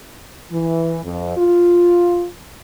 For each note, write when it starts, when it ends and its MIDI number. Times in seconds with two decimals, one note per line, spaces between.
0.51 0.98 52
1.04 1.36 41
1.37 2.26 65